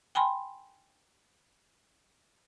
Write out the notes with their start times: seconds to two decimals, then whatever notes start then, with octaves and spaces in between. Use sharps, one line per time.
0.15 G5 G#5 B5 C6